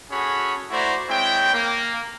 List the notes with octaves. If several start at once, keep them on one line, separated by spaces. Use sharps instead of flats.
C#4 F#4 G#4 A4 C#5 B5
A3 E4 F#4 C5 D5 A#5
G#3 C4 E4 C#5 G5
A#3